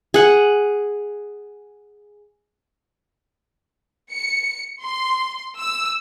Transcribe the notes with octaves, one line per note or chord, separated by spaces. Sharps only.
G#4 F#5
C#7
C6
E6